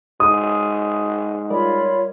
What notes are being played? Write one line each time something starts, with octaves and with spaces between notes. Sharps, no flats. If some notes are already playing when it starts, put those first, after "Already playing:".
G#2 F#4 D#6
G3 F4 A#4 C#5 D5 B5